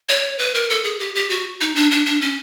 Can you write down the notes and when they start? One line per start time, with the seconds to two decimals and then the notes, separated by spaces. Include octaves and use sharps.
0.09 C#5
0.39 B4
0.55 A#4
0.70 A4
0.84 G#4
1.00 G4
1.15 G4
1.29 F#4
1.61 D#4
1.75 D4
1.91 D4
2.06 D4
2.21 C#4